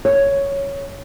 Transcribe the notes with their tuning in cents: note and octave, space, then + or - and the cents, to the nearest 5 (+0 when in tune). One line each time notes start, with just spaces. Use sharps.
C#5 +5